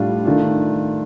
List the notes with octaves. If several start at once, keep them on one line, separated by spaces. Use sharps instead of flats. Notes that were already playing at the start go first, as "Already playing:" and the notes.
Already playing: A2 G3 D4 F4
D#3 A3 D4 F4